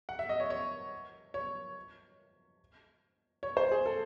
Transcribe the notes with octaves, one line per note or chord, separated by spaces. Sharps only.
F#5
E5
D#5
C#5
C#5
C#5
C#5
C5
G#4
A4